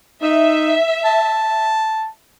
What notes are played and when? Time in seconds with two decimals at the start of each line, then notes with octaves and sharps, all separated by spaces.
0.22 D#4 E5
1.04 A5